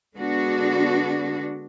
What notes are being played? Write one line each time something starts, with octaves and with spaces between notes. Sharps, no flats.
D3 G#3 B3 D4 F#4